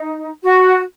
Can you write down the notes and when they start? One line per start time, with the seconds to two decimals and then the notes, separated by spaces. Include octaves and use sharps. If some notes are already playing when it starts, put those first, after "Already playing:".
Already playing: D#4
0.43 F#4